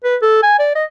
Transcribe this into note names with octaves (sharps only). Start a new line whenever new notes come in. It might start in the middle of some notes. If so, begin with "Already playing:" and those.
B4
A4
G#5
D5
D#5